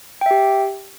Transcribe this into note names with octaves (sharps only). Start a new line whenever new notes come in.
G4 E5 G5